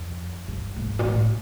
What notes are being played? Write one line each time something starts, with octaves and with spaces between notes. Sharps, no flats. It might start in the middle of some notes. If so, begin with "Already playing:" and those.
Already playing: F2
G2
G#2
A#2
A2